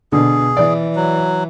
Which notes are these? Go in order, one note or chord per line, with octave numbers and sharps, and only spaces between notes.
B2 D3 G#4
E3 D5
F#3